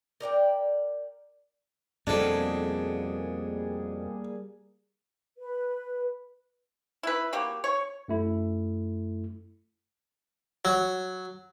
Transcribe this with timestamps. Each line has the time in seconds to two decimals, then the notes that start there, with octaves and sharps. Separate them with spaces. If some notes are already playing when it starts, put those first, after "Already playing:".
0.20 A#4 D5 F#5 G5
2.07 F2 B2 G3 A#3 D4 G#4 A4
5.38 B4
7.03 E4 B4
7.33 A#3 F#4 G4
7.64 C#5
8.08 F#2 A3 E4
10.65 F#3